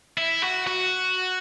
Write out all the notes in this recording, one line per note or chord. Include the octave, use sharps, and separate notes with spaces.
E4
F#4
F#4